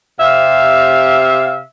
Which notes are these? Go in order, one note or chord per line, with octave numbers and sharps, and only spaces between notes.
C3 E5 F5